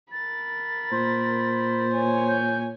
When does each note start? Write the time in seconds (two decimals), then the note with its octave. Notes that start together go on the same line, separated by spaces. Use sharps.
0.12 A#4 B5 A6
0.92 A#2 C5
1.91 C#5 G#5
2.28 G6